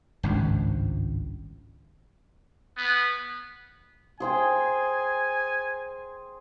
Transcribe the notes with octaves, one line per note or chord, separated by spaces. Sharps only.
G#1 C#2 G2
B3
G#4 C5 G5 G#5